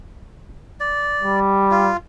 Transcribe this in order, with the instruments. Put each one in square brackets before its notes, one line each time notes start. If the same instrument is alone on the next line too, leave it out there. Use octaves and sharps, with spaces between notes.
[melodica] D5
[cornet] G3
[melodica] F4